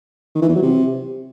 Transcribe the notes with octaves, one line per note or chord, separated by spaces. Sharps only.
D#3
E3
E2
F#3
C3